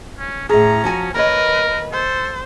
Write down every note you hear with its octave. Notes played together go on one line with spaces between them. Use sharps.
C#4
A2 C#4 G#4 A#5
F3 F#4 G#5
D#2 A#4 B4 C#5 D#5
A4 C5